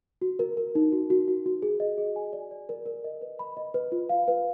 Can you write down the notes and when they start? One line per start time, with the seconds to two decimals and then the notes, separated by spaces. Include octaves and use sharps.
0.22 F#4
0.39 A#4
0.57 A#4
0.75 D#4
0.92 F#4
1.10 F#4
1.28 F#4
1.46 F#4
1.62 G#4
1.80 D#5
1.98 G#4
2.16 G#5
2.33 D5
2.51 D5
2.69 A#4
2.86 A#4
3.04 D#5
3.22 B4
3.39 B5
3.57 D#5
3.74 B4
3.92 F4
4.09 F5
4.28 B4